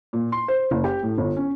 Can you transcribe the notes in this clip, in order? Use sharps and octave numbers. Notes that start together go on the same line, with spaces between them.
A#2
C6
C5
F#1
G4
A2
G1
C#4